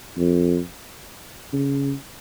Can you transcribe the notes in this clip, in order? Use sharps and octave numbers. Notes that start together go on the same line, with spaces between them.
F2
C#3